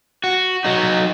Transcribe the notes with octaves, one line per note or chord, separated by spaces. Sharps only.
F#4
F#3 D#4